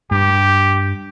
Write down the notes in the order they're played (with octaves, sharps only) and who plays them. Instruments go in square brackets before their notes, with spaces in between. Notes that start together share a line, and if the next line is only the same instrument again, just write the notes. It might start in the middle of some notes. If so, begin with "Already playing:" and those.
[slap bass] G2 [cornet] G4